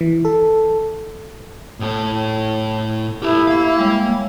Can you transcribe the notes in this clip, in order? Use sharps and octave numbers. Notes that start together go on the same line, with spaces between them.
E3
A4
A2 A4
E4 G4 A4
A#3 F5
G3 G#3 C#5